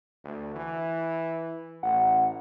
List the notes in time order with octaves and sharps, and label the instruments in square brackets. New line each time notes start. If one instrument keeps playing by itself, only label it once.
[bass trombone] D2
E3
[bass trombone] A1 [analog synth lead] F#5